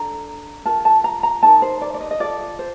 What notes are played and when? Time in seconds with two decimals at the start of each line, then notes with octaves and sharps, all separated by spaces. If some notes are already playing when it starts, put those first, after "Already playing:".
Already playing: D4 A4 A#5
0.65 F4 A#4 A5
0.85 A5
1.04 A#5
1.23 A#5
1.43 D#4 A#4 A5
1.62 C5
1.82 D5
1.94 D5
2.01 D#5
2.11 D#5
2.20 F4 A4 D5
2.59 C5